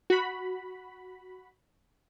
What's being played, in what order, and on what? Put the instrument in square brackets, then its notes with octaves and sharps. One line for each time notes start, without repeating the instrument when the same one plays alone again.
[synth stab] F#4 B5